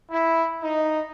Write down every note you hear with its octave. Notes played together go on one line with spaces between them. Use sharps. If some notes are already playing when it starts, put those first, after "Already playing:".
E4
D#4